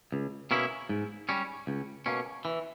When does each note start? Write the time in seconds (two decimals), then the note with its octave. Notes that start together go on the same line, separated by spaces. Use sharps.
0.12 C#2
0.51 B2 A#3 C#4 E4
0.89 G#2
1.29 G3 C#4
1.67 C#2
2.06 B2 A#3 C#4
2.45 E3